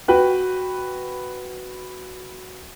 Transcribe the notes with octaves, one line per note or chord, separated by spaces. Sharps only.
F#4 B4 G5